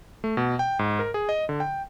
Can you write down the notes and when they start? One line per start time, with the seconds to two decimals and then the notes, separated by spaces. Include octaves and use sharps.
0.24 A3
0.37 B2
0.59 G5
0.79 G#2
0.99 A#4
1.14 G#4
1.29 D#5
1.49 D3
1.60 G5